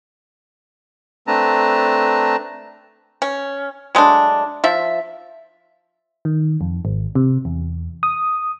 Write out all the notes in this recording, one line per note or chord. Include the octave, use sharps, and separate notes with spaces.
A3 C4 D4 B4 A5 A#5
C#4
F#3 G#3 A3 D4
F3 E5
D#3
F2
G#1
C3
E2
D#6